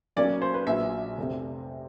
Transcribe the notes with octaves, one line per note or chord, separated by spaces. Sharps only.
B1 B2 F#3 A#3 C#4 D5
C5
B4
A#1 A#2 F#3 E5
F1 C3